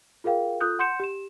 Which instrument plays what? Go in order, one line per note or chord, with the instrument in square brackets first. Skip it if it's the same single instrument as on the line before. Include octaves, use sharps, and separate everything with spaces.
[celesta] F4 G#4 A#4 F5 G5
F4 A4 D#6 F#6 G6
F#5 C6 G6 C#7 E7
G4 E7